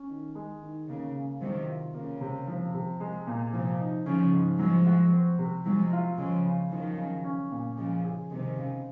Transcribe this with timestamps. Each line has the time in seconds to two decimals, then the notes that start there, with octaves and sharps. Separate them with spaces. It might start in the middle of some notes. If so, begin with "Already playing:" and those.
Already playing: C#4
0.09 D#3
0.35 G#3
0.62 D#3
0.89 C#3 A#3
1.15 C#3
1.41 C3 D#3 F#3
1.68 F4
1.94 C#3 A#3
2.21 C3
2.47 F3
2.74 C3
3.00 G#3
3.27 A#2
3.53 C3 F3
3.80 D#4
4.06 C#3 F3 C#4
4.32 G#2
4.59 F3 F#3 G#3
4.86 F#4
5.12 C4
5.39 C3
5.65 F3 F#3 G#3
5.93 F4
6.18 C#3 F3 G#3
6.45 C#3
6.71 D#3 F3 F#3
6.98 C#3
7.24 C#4
7.51 A#2
7.77 C#3 F3 G#3
8.05 G#4
8.31 C3 D#3 G#3
8.57 C#3